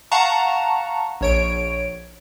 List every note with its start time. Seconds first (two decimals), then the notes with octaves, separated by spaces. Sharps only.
0.11 F5 F#5 A5 A#5 C#6
1.21 A#1 C#5 D7